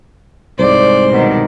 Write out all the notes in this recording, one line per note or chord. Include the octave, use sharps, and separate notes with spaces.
C2 G#2 C5 D5
B2 D#3